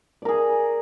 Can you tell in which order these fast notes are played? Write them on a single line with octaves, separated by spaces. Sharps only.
D5 A#4 G#4